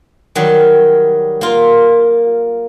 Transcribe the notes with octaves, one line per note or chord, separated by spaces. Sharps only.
D#3 F#3 G3
A#3 F4